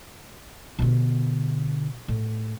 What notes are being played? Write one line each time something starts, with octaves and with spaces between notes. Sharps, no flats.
B2 D3
A2